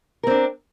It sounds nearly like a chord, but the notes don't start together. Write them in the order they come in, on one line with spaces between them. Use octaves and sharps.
A#4 C4 D4